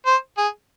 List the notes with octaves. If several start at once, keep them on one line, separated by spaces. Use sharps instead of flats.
C5
G#4